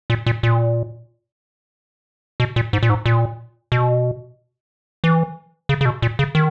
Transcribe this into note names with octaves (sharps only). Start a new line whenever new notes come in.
A#2
A#2
A#2
B2
A#2
G#2
A#2
G#2
A#2
B2
E3
C#3
C#3
B2
A#2
C#3
D#3